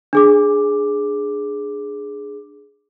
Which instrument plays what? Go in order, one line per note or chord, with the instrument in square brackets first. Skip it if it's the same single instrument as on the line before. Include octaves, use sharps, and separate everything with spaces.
[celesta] D4 G#4 D6